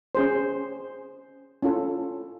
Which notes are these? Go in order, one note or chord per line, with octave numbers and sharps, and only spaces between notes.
C#4 G#4 C5
C#4 E4 F4 A4